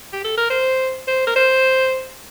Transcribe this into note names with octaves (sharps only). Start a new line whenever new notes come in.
G4
A4
A#4
C5
C5
A#4
C5